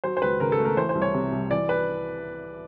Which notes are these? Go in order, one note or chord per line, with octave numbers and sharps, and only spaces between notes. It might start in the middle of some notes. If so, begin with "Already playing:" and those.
F#3 C5
C5
C#2 B4
C#3 A#4
A4
A3
A#4
E3 C5
C5
C2
C#5
C3
C2
E3 D5
B4